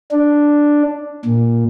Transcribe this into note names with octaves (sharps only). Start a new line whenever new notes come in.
D4
A#2